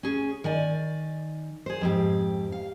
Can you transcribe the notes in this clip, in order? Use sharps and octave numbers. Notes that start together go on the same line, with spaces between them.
C#4 G#4
D#3 D5 G#5
G#4 C5
F2 G#2 G4
F5